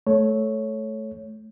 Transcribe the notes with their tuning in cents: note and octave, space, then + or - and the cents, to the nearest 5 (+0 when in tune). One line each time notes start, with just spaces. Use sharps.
A3 -15 C#5 +0